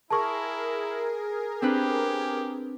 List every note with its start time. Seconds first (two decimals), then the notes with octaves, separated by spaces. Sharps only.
0.11 E4 G#4 A#4 A5 C#6
1.62 C4 D4 G4 B4